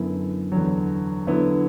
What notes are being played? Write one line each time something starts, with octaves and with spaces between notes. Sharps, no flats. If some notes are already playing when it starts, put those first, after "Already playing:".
Already playing: F#2 D3 B3 E4
E2 D3 F#3
D3 F#3 B3 E4